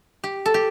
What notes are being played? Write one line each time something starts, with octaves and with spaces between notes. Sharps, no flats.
G4
A4
G4